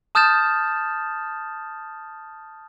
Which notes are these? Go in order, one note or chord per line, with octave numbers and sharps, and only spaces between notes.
A5 D#6 F6 G6 A6 E7